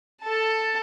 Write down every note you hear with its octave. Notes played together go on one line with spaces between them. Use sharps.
A4 A5